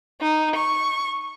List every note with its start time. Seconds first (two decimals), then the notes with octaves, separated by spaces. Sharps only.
0.21 D#4
0.56 C#6